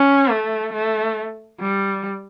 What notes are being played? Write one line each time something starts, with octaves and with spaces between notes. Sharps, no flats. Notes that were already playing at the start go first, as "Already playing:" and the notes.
Already playing: C#4
A3
A3
G3